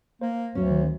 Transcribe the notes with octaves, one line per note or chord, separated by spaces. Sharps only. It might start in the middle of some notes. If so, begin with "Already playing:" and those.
A#3 C5
D2 F#3 C#4
D#3